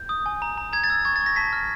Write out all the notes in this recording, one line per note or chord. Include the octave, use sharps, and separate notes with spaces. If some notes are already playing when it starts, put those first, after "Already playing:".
Already playing: G6
D#6
G#5
A#5
A#5
A#5 G#6
A6
E6
G#6
C#6 G#6
A6
C#6
A#6
A5 B6
F6